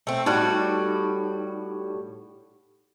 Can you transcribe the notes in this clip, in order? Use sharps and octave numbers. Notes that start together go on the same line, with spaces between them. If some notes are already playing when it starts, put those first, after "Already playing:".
A3 C4
A2 G3 D#4 F#4 A5 F#6